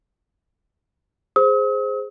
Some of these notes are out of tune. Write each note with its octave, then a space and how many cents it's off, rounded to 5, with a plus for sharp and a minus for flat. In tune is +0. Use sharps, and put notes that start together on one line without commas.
G#4 +0 C5 +0 D#6 +45